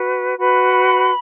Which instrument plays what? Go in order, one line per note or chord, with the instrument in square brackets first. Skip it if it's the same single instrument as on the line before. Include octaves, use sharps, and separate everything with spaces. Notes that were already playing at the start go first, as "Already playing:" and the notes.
Already playing: [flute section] F#4 B4
F#4 B4 B5